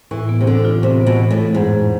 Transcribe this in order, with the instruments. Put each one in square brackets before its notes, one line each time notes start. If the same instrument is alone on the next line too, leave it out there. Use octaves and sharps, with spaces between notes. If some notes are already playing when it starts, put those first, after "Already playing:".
[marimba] A2 [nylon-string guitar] E3
[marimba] B3
[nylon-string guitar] C3
[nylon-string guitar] D3 [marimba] E3
[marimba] F4
[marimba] A2 [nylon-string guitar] C3
[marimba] B3
[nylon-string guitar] B2
[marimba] E3
[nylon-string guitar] A2
[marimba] F4
[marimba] F2 [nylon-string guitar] G#2
[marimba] G#3